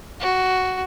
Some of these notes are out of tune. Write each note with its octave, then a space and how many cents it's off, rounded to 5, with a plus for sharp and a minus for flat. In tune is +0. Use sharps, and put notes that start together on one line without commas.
F#4 +5